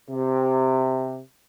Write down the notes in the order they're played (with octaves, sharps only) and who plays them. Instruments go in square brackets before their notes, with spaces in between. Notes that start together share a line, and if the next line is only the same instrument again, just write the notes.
[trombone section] C3